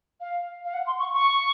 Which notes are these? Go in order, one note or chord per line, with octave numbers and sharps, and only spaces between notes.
F5
F5
F#5
C6
C#6
C#6